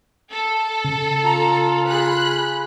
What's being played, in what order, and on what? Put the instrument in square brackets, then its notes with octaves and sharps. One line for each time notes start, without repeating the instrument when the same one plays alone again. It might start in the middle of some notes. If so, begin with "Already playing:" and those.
[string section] A4
[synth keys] C#3
[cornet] F4 [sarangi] A#5
[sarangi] G#4 [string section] B5 F#6